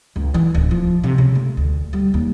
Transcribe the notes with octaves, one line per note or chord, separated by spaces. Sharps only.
C#2
E3
D1
F3
C3
C#3
A3
D2
G3
D#2